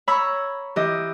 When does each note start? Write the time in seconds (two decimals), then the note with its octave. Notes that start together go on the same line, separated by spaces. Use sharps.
0.07 C#5 A#5 B5 C#6 E6
0.76 E3 G4 D#5